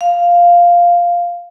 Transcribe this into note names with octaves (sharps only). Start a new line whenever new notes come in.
F5